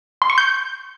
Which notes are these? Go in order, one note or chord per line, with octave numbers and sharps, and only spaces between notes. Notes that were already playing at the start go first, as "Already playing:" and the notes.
C6
C#6
G6